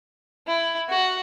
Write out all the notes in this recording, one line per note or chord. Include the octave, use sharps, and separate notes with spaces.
E4
F#4